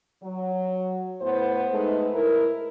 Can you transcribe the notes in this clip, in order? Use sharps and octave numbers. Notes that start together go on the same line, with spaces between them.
F#3
A2 B3 C5
G#3 A3 D#4 B4
A2 E4 A#4